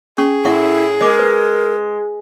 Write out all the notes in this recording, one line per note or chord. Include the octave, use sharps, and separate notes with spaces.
C#4 G#4 C#6
A2 E4 E5 F#5 C#6
G#3 A#4 D#5 D6
B4